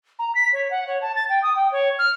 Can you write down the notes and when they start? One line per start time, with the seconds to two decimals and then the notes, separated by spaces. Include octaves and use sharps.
0.19 A#5
0.35 B6
0.53 C#5
0.71 F#5
0.87 C#5
1.02 A5
1.15 A6
1.29 G5
1.42 D#6
1.55 G5
1.72 C#5
1.99 F6